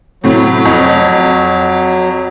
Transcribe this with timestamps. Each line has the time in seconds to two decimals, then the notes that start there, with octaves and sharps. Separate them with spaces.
0.24 A2 C3 F#3
0.65 F2